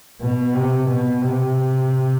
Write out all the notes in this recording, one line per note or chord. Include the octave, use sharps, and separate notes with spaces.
B2
C3
B2
C3